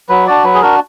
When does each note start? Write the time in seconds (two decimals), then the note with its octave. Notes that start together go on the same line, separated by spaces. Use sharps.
0.09 F#3 B4
0.27 D4 F#4 D5
0.44 F#3 B4
0.55 G#4
0.62 D4 F#4 A#4